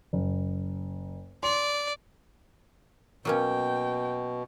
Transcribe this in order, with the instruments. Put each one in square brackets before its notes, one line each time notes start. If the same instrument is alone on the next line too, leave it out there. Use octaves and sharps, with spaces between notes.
[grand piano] F#1
[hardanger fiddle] D5 [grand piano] C6
[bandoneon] B2 [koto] F#3 A#3 C#4 [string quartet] G5